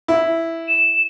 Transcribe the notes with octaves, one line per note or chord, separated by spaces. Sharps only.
E4
E7